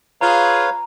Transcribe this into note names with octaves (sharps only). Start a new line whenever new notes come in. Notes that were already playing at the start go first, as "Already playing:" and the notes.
F4 G#4 B4 C#5 F5 A#5